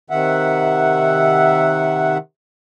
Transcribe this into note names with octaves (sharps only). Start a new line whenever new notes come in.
C3 D#3 E5 F#5